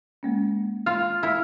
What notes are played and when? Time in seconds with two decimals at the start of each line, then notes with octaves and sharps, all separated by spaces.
0.23 G#3 A#3 C#4
0.86 F4 F6
1.23 E4